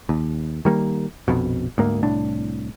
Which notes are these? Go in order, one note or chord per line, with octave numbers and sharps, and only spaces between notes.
D#2
D#3 G3 A#3
A#1 F2 B2
D2 G#2 A#3
C2 A2 D4